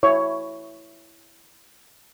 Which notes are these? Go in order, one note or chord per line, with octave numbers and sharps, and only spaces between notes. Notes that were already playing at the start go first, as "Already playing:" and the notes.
E4 C#5